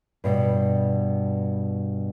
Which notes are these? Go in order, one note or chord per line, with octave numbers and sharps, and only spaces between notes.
G2 B2